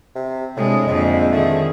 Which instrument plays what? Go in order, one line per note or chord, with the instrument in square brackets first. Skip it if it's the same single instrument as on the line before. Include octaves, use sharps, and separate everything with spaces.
[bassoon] C3
[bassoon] A2 [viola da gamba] C3 [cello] G#3 D4
[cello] F2 D3 [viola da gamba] A#2 C4 [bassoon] G#3
[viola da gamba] D#3 G#3 G#4 [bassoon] A3